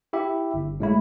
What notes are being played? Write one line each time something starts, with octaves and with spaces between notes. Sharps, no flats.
E4 G4 E5
G1
A2 G#3 E4